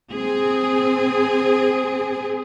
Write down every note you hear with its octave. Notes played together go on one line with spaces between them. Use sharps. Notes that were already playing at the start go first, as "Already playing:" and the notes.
C4 G#4